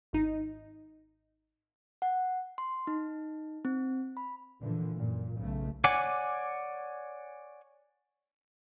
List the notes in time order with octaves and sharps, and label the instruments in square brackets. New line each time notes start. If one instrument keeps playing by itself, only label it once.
[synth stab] G#1 D#4
[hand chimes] F#5
C6
D#4
C4
B5
[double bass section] A#2 D3 E3 F3
F#2 A#2
B1 C#3 A3
[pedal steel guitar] C#5 D5 F#5 G#5 D6